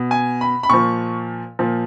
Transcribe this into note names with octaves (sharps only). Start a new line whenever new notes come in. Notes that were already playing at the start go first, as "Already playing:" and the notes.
Already playing: B2
G#5
B5
B5
A#2 F3 C#6
A#2 F3